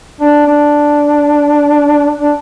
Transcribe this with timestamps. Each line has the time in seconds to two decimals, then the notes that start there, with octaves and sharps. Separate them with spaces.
0.20 D4
0.46 D4
2.19 D4